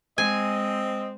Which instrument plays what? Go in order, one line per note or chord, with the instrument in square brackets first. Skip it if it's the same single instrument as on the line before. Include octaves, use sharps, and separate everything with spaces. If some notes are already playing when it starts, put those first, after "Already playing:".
[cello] G#3 [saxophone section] C4 [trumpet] D#5 [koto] G#5